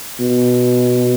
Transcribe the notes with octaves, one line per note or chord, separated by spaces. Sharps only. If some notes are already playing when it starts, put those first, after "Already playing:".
B2